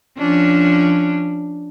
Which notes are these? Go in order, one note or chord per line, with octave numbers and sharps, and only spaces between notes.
F3 C#4 D4